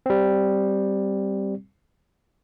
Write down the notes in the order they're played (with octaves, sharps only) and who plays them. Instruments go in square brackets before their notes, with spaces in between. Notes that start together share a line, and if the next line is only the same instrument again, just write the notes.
[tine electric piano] G3 C4